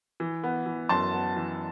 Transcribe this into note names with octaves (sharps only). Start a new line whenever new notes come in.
E3
B3
E3
F#2 A5 C6
B3
E3